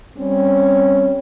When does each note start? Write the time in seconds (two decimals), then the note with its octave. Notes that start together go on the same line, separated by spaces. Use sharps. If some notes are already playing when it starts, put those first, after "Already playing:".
0.18 G3 C4 C#4